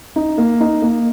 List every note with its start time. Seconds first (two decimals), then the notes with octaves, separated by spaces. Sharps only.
0.16 D#4
0.38 A#3
0.60 D#4
0.82 A#3